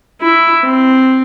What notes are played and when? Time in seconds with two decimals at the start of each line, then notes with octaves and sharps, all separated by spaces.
0.22 E4
0.64 C4